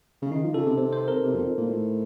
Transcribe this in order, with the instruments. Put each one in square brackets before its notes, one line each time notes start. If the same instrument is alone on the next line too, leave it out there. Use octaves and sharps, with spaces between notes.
[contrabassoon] C#3
[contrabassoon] D#3 [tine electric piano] D#4
[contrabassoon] F3
[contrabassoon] C#3 [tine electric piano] A4
[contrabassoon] C3
[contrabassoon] C3 [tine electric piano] C5
[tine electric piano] C5
A#4
[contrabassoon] C3
F2
A#2
A2